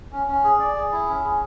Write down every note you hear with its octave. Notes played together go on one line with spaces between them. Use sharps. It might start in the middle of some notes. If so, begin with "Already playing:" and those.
C#4
C#4
G#4
D5
G#4
E4
C#4
G#4